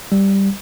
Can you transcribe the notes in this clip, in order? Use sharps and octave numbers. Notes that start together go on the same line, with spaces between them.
G3